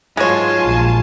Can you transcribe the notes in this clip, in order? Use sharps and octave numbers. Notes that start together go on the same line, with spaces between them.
G#2 F#3 G#3 F4 C#5 G#5 A5
A#1